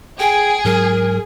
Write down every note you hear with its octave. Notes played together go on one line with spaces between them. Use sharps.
G#4 G5
G#2 F#3 A#4